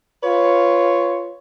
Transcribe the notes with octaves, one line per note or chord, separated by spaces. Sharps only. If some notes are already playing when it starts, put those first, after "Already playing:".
F4 B4 C#5